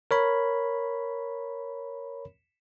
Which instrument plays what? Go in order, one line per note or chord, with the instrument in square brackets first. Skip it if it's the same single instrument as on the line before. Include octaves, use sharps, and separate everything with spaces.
[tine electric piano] A#4 C#5 B5